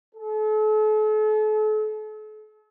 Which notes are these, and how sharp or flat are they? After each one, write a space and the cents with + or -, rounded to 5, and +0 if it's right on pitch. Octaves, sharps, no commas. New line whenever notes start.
A4 -40